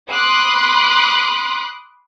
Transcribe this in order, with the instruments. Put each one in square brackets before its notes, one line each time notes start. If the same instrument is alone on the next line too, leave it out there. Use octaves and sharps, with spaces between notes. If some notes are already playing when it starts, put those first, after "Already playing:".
[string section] B5 C6 D6 D#6 F#6